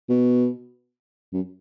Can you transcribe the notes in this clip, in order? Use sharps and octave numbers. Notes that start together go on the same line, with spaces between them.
B2
F#2